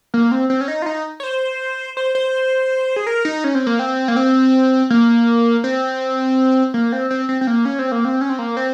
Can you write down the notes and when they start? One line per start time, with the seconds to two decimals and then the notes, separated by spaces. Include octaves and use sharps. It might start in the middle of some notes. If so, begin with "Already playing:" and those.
0.14 A#3
0.32 C4
0.50 C4
0.61 C#4
0.68 D#4
0.82 F4
0.86 D#4
1.20 C#5
1.23 C5
1.97 C5
2.15 C5
2.96 G#4
3.07 A#4
3.25 D#4
3.44 C#4
3.55 C4
3.67 A#3
3.79 C4
4.08 A#3
4.16 C4
4.90 A#3
5.64 C4
6.74 A#3
6.92 C4
7.11 C4
7.29 C4
7.41 C4
7.47 A#3
7.65 C#4
7.79 C4
7.92 A#3
8.05 C4
8.21 C#4
8.30 C4
8.39 A#3
8.57 C4